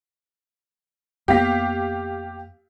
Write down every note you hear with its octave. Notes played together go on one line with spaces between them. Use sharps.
F2 A#3 B3 G4 F5 B6